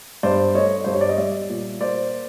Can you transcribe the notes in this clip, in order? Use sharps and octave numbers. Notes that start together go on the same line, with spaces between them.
G2 C5 D5
A3 C#5 D#5
G2 C5
C#5
D5
D#5
G3 D5 E5
A#2
A#3 C5 D5